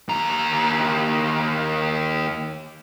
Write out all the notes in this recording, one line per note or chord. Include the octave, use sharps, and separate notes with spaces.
D#2 A#5